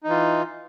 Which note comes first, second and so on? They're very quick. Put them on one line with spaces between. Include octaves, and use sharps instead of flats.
D#4 E3 F4